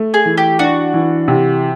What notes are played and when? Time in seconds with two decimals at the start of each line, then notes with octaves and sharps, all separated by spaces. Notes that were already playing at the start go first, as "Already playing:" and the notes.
Already playing: A3
0.14 G#4
0.26 E3
0.37 G4
0.59 D4 F#4
0.94 E3
1.28 C3